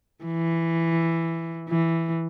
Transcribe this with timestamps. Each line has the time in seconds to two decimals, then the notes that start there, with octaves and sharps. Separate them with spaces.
0.25 E3
1.69 E3